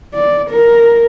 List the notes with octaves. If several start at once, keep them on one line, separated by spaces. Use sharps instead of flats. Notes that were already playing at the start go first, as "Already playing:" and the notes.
D5
A#4